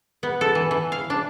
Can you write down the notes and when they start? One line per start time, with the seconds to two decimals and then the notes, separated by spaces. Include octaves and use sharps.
0.23 B3
0.41 A4
0.55 E3
0.71 E3
0.92 F5
1.10 D4